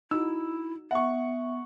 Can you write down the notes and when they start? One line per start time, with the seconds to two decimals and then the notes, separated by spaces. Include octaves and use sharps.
0.11 D#4 E4 F#4 E6
0.91 B3 E5 F#5 C#6